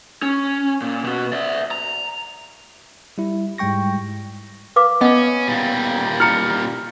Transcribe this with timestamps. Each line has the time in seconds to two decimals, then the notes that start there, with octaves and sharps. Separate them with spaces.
0.22 C#4
0.81 A#2
1.04 B2 F#4
1.33 D5 E5
1.71 A#5
3.18 G3 E4
3.58 G#2 G3 G#3 G5 C#6 A#6
4.76 B4 F5 D6
5.01 B3 C#4 D#5 F#5
5.48 A#2 G3
6.20 E4 A#5 F6 C#7